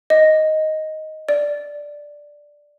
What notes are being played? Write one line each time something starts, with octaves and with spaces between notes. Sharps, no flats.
D#5
D5